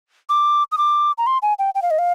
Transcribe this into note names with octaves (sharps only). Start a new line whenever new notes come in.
D6
D#6
D6
A#5
C6
G#5
G5
G5
F5
D#5
F5